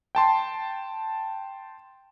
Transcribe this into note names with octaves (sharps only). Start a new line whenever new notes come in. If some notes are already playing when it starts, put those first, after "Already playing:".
G5 A5 C6